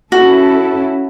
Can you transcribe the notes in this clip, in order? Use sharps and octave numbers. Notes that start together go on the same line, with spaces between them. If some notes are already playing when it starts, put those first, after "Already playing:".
C#4 E4 F#4 A4